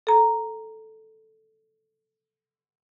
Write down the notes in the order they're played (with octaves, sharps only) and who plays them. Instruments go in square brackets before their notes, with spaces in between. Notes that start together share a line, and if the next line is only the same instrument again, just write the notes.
[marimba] A4 A#5